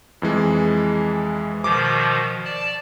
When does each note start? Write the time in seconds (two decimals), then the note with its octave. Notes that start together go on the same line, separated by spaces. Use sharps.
0.22 F2 E3 G#3
1.64 B2 D#3 F3 D6
2.45 D5 A5